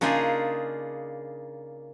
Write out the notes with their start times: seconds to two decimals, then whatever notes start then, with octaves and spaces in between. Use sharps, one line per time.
0.01 C#3 A#3 D4 D#4 F4 G#4